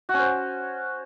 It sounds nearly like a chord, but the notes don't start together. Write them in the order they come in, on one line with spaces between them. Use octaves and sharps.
F#4 C#4 C5